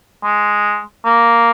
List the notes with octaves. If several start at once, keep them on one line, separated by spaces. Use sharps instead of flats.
G#3
A#3